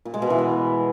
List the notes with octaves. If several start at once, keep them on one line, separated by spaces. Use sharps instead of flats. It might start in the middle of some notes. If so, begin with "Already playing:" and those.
A#2
G#3
B2
E3
B3